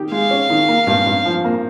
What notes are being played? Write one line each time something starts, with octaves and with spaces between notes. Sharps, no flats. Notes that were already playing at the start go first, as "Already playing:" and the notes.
Already playing: D#3 G4
G#3 F5
C#4
D#3
A#3
G2
G2
F3
A#3